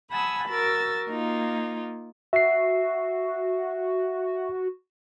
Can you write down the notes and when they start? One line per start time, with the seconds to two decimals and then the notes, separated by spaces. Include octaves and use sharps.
0.12 F#5 G#5 A5 B5 D#6 E6
0.49 F#4 A#4 E6 A6
1.09 A#3 D#4 F4
2.33 F#4 E5 C7